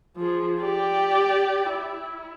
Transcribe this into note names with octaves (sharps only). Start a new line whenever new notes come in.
F3 G#4
G4 D5
E4